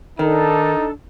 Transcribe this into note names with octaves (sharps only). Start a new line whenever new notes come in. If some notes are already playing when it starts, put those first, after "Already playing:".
D#3 D4 D#4 A4